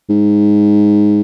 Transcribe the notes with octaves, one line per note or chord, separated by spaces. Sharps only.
G#2